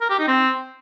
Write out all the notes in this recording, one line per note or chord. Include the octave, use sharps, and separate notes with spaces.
A#4
G4
D#4
C4